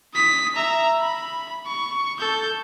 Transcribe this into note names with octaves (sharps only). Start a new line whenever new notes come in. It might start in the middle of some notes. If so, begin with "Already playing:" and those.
D#6 B6
E5 A#5
B5
C#6
A4 G6